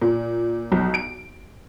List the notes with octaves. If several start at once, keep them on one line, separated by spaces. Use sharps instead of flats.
A#2
B1
D7